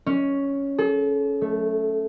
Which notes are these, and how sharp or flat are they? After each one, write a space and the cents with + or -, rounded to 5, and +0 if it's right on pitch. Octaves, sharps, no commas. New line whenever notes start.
C#4 +5
A4 -40
A3 -5